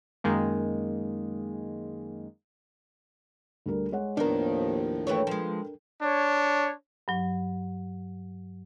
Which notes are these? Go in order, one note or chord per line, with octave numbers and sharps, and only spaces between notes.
F#2 D#3 G#3 A#3
D2 G3 A#4
G#3 C#5 F#5
D#2 A2 D#3 F3 A#3 B3 D4 A#4
E3 A3 A4 B4 C#5 G5
F3 G#3
D4 C#5
G2 F#3